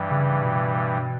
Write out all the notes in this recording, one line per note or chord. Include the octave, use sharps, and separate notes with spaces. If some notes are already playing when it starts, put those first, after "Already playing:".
Already playing: G2 E3 G3
C#3
B2